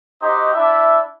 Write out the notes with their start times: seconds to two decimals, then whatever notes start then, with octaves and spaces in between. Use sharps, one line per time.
0.21 D#4 F#4 G4 C5 D#5
0.53 D4 E4 E5